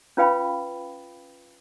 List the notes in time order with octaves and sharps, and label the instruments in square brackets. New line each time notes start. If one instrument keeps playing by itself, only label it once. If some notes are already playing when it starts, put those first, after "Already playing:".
[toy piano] C#4 F4 B4 F5 G5 B5